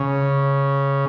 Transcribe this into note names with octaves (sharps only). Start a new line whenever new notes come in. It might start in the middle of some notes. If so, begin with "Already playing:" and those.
Already playing: C#3